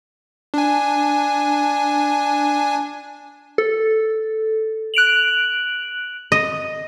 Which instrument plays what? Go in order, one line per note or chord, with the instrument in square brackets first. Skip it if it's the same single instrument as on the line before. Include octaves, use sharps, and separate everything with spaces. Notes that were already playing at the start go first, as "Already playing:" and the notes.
[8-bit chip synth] D4 G#5
[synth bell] A4
F#6 D7 F7 F#7
[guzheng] D#5